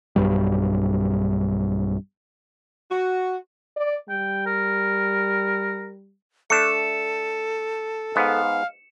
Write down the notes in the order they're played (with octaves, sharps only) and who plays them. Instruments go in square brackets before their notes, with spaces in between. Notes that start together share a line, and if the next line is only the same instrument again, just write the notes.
[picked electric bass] B1 G2 G3
[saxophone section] F#4
[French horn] D5
[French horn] G3 [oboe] G5
[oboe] A#4
[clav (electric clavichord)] A3 D4 [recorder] A4 [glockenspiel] C#7 E7
[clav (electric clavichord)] G#2 B3 [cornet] F5